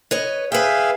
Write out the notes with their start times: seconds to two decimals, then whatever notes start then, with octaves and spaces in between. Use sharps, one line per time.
0.11 B4 C#5 D#5
0.52 G#4 B4 E5 F5 G5